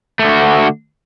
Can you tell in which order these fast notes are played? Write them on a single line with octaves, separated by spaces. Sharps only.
A3 D3 F#4